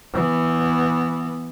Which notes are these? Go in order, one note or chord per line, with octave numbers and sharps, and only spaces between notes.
E3 B3